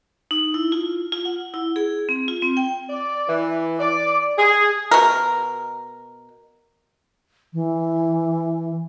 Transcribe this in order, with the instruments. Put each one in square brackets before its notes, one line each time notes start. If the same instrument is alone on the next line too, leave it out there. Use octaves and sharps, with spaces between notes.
[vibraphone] D#4
E4
F4
F4
F#5
E4
G#4
C4
F4
C4
G5
[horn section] D5
E3
D5
G#4
[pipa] B2 A#4
[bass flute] E3